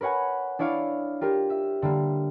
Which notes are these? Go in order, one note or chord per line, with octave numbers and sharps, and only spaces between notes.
A#4 B4 C#5 F#5 G#5
D4 E4 C#5 D5 F5
F4 G4 A#4
E5
D3 G3 A#3